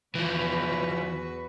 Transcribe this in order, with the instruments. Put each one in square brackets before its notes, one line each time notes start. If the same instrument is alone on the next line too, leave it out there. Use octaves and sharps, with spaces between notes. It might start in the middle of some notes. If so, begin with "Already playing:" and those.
[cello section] E2 F#4 B4 [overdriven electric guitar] E3 F3